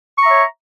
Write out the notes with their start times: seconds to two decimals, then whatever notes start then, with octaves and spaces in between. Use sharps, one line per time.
0.18 C#6
0.22 A#5
0.26 E5
0.30 C#5